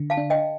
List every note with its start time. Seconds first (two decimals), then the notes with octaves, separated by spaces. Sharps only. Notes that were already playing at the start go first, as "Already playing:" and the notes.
Already playing: D3
0.10 F5 A5
0.17 D4
0.30 D#5 G5